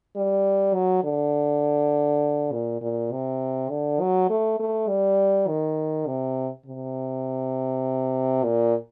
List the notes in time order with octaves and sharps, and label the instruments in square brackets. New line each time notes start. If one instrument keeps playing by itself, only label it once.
[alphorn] G3
F#3
D3
A#2
A#2
C3
D3
F#3
A3
A3
G3
D#3
C3
C3
A#2